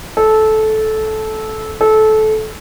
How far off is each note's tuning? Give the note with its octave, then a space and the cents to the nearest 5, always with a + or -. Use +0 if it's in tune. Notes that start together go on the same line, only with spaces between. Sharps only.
A4 -15
A4 -20